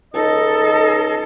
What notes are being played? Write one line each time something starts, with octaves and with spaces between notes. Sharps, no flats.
C#2 D#4 A4 D#5